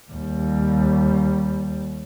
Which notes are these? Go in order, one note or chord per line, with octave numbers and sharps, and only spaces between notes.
D#2 G3